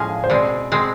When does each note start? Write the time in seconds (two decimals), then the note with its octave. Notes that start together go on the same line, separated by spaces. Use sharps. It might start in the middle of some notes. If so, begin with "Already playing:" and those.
Already playing: A2 F3 G#3 G#5
0.10 F5
0.24 C5
0.30 B2 G#3 C4 D5
0.72 B2 G#3 C4